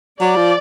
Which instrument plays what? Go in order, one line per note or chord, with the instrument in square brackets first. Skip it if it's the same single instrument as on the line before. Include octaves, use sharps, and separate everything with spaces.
[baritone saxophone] F#3 [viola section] D5
[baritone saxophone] F3